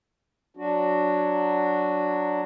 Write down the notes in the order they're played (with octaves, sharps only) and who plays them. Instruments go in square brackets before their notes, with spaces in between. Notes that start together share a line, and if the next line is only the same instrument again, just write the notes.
[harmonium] F#3 D4 F#4